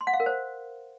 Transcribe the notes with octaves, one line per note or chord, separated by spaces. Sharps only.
C6
F#5
F5
A#4
C5